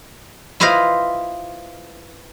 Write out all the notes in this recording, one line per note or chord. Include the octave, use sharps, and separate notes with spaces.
E4 F4 B4 C5 D#5 F5